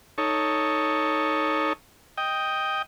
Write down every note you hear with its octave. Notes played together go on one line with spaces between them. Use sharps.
D#4 A4 C#5
D#5 G5